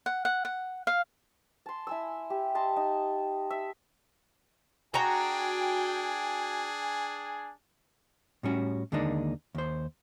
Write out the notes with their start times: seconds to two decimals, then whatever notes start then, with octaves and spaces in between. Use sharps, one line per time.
0.06 F#5
0.25 F#5
0.45 F#5
0.87 F5
1.66 A5 C6
1.87 E4 G#5 E6
2.30 G4
2.55 D#5 A5 C6
2.77 D#4
3.50 E5
4.94 D4 F#4 G#4 G5 G#5 A#5
8.43 A2 G3 C#4 F#4
8.92 D#2 D3 G#3 A#3 D4 D#4
9.55 D#2 C5